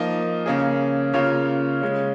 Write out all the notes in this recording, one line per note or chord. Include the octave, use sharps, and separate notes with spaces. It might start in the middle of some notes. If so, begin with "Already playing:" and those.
Already playing: F3 A#3 D#4
C#3 A#3 C#4 G#4
C#3 A#3 F4 C#5
C#3 G#3 C#4